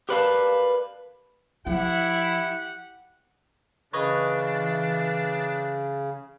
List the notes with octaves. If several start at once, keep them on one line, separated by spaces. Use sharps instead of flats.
G4 A#4 B4 D5 F5 A5
F3 E4 G4 F#5
C#3 E3 D4 B4 C#5 D#5